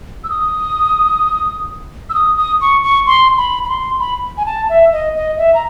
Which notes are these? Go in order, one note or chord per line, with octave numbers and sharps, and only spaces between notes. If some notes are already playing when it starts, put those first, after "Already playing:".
E6
D#6
E6
D#6
D#6
C#6
C#6
C6
B5
B5
C6
B5
G#5
A5
E5
D#5
D#5
E5
A#5